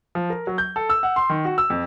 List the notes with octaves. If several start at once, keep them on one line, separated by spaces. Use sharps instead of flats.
F3
A#4
F#3
G6
A4
E6
F#5
C6
D#3
F#4
E6
F2